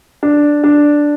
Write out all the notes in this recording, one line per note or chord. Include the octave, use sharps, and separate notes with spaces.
D4
D4